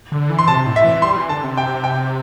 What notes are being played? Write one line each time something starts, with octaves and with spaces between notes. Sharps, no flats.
D3
E3
C6
C3 A5
A2
E5
E3
G3 C6
E3
D3 A5
C3
G5
G5